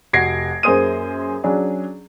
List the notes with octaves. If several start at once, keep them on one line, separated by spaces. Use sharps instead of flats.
F1 F#4 G#6 A#6 C7 D7
F#2 A#3 G#4 C5 D#6 D#7
F#3 C#4 D4 G#4